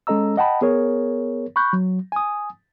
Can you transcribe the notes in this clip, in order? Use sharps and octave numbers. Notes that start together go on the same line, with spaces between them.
G#3 C#4 A4 D#5 A#5 E6
D#5 F#5 G5 A5 B5
B3 G#4 A#4 C#5
B5 C#6 F#6 G6
F#3
G#5 D#6